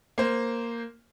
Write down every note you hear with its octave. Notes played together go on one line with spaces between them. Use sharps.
A#3 C5